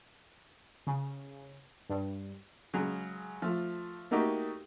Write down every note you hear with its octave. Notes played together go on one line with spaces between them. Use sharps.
C#3
G2
C#3 F#3 G#3
F3 A3
A3 A#3 D#4 F#4 G4